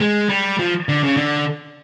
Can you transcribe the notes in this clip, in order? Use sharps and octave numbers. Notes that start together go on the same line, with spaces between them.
G#3
G3
F3
D3
C#3
D3